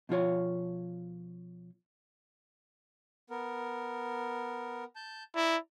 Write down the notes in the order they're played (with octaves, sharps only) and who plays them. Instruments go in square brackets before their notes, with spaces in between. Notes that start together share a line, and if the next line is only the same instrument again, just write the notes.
[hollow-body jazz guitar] B2 F3 F4 C#5
[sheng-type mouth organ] B3 A#4
A5 G6
[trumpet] E4 [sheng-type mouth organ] D5 A#5